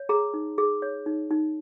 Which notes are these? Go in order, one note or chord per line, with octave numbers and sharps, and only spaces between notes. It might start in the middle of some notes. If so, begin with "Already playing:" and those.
Already playing: C#5
G#4 A#5
D#4
G#4
C#5
D#4
D#4